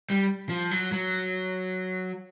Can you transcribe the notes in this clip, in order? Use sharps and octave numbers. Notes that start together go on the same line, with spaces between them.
G3
F3
F#3
F#3